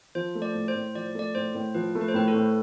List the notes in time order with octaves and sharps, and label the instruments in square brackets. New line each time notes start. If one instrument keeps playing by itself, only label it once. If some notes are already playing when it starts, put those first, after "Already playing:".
[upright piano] F3 [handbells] C5
[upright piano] A3
[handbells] D5
[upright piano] A2
[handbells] C5
[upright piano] A2
[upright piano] F3 [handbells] D5
[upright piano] A3 [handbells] D5
[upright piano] A2 [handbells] C5
[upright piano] A2
[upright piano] F3 [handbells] B4
[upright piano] A3
[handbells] B4
C5
[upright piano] A2 [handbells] B4
[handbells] A4
[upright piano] A2